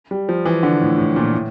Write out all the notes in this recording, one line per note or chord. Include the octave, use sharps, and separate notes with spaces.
G3
F3
E3
D3
A2
A2
A#2
A2